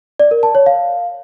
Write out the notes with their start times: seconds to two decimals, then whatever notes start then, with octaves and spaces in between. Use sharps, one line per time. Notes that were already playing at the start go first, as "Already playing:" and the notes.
0.19 D5
0.31 A#4
0.43 A5
0.55 C#5
0.66 F5